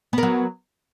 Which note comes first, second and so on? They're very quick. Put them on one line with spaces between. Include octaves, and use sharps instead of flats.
B3 A#4 F#3